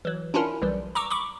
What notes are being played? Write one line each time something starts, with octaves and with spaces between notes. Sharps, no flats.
E3 F#3
C#4 D4 E4 F4 A#4
B1 E3 G3
A#5 C#6 D6 E6
B5 C#6 D6